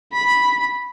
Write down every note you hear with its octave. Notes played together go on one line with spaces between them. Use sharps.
B5